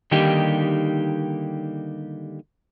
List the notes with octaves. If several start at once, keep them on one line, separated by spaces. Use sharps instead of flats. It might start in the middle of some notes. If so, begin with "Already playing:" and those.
D3 D#3 G3 A#3 D#4 G4